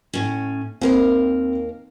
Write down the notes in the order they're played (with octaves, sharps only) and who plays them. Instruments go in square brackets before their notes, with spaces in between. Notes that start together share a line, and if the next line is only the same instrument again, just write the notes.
[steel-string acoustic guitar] A2 C#4
[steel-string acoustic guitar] D#2 A#4 F5 [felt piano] C4